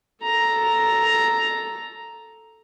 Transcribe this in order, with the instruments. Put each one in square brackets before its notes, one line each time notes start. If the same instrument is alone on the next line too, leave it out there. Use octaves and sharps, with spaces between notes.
[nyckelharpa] A4 A#5